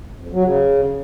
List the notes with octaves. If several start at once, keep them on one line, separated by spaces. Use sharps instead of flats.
F2
F#3
C#3